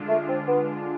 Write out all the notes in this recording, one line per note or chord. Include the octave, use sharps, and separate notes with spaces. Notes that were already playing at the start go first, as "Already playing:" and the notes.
Already playing: D3 G#3 D4 F4
A3
C4
B3